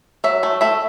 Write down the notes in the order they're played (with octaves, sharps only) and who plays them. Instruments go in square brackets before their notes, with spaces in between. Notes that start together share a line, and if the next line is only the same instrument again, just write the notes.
[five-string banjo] F#3 E5
A3
A3 E5